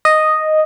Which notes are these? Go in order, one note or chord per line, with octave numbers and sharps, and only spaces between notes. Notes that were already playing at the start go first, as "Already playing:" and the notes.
D#5